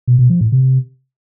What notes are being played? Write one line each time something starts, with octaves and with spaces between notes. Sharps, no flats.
B2
B2
F3
A2
C3